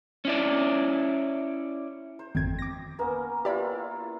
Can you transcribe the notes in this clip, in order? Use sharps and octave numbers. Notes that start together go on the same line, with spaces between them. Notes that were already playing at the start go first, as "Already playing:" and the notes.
C#4 E4 D5
C5
G#1 F2 G5 G#6
D6 A#6
A#3 B3 C#4
E4 F4 G4 D5 B5